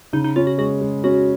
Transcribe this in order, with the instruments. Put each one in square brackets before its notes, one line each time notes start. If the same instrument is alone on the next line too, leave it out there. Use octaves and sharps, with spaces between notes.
[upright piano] C#3 [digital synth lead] D#4
[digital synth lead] D#4
[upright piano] C#4 [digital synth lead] F4
[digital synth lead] F#4
[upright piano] G#3 [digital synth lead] F#4
[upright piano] G#3
[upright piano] C#4 [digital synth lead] F#4